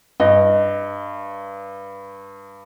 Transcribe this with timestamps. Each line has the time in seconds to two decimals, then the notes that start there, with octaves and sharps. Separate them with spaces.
0.20 G2 D#5